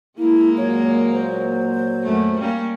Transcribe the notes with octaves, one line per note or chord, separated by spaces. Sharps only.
G#3 A#3 E4
A#2 F#3 C#5
C5
F#2 A3
G3 A#3 C#4